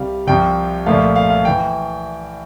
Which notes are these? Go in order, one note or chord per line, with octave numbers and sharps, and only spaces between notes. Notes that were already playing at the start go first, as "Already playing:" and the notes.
Already playing: C2 C3 G3 F5
C2 C3 F3 G5
C2 A#2 F3 A3 F5
F5
F5
E3 G5